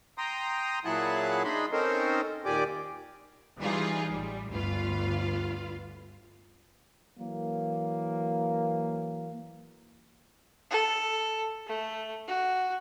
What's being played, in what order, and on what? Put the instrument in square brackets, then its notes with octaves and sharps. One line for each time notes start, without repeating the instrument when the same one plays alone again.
[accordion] G5 A#5 C6 D#6
A#2 F#3 E4 G#4 F#5 A5
D4 D#4 G#4 B5 C6
C4 C#4 D#4 A4 A#4 C5
D#2 A#2 G4 D5 G#5 D6
[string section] E3 G3 D#4 F4 G#4
A1 G3
G1 D2 F4 B4 F5
[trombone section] E3 F#3 A#3
[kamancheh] A4
A3
F#4